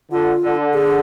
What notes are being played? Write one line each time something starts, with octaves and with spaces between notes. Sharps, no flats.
D3 F4
D3
G#4